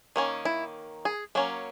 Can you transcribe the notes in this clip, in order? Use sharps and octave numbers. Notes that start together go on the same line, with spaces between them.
D#3 A#3 C#4
E4
G#4
F#3 A#3 C#4